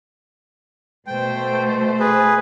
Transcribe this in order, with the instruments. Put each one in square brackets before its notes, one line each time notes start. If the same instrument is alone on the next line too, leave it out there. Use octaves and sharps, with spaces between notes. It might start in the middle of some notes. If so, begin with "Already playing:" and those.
[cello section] B2 A3 C5 [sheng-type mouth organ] G5
[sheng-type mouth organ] G#4 B4